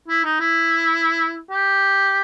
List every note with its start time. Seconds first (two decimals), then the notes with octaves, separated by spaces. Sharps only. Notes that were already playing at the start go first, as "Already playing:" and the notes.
0.08 E4
0.24 D#4
0.40 E4
1.51 G4